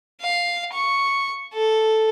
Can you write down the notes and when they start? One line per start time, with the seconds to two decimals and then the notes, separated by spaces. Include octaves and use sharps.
0.21 F5
0.73 C#6
1.54 A4